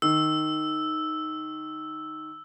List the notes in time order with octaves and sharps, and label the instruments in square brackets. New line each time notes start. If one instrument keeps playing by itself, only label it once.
[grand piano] D#3 [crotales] E6